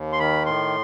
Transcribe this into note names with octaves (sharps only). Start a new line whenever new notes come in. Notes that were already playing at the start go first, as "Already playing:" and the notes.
Already playing: D#2
C6
D#3 B5
A2 C6